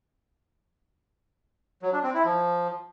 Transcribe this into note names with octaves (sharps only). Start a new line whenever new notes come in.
F#3
D4
C4
E4
F3